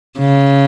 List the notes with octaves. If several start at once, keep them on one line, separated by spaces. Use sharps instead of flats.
C#3